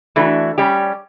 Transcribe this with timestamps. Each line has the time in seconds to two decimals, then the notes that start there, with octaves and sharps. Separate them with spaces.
0.16 E3 A3 D4 F#4
0.58 G3 C#4 G4